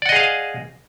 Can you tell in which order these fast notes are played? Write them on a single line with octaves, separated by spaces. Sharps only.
D5 F#5 D#5 G#4 F5